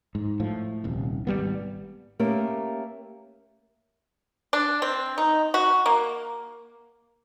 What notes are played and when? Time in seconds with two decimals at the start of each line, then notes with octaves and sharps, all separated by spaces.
0.15 G#2
0.40 A2 F3
0.84 D#1 C2
1.27 G#1 G2 G3 B3
2.19 A3 A#3 C#4 G4 A#4
4.53 D4
4.82 C4
5.18 D#4
5.54 F#4
5.86 A#3